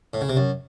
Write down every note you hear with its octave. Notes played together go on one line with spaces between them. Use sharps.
A2
C#3
C3
F#2